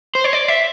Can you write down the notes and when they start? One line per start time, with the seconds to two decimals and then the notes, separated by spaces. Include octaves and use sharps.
0.15 C5
0.24 C#5
0.33 D5
0.48 E5